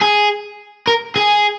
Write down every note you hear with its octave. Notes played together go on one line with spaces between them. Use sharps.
G#4
A#4
G#4